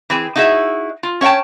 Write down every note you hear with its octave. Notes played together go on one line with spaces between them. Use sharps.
E3 C4 G#4
D#4 E4 F#4 G#4 E5
F4
C#4 C#5 F#5 G5 A5